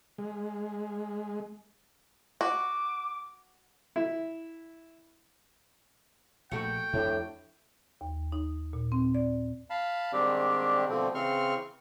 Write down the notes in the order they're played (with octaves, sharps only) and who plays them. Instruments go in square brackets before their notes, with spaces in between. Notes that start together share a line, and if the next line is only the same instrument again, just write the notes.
[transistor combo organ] G#3
[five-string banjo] F#4 [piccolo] D6
[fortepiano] E4
[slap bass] A#1 [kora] A3 F#4 F#5 [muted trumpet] G5
[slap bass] F2 D4 [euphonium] A2
[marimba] D#2
D#4
A#2
C4
D5
[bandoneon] F5 A5 B5
G#2 D#3 G3 C4 D4 G4
B2 D3 F3 G3 A3 C4
C#3 E3 C4 C6 C#6 F6